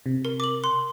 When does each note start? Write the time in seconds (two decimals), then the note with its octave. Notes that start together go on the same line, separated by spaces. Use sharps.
0.06 C3
0.25 A#4
0.40 D6 F#7
0.64 C6